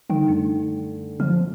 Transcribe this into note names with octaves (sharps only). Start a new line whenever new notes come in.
D3 G3 D#4 G5
F#2 A3 D4
F3 F6